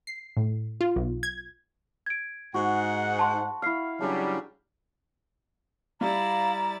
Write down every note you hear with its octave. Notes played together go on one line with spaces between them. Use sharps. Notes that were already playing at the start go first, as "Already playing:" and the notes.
C7
A2
F4
B1
G#6
G#6 D7
G#2 F#4 F#5
A5 C6
E4 F5 F6 C7
C#3 F#3 G3 D4
G3 E4 D5 F5 A#5 A6